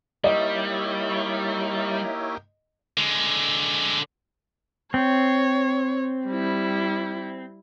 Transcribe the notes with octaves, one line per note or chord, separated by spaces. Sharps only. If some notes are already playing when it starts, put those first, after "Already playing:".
G3 A#3 D#4 E4 G4 C#5 D#5 E5
D3 G#3
C4 C#5
G3 E4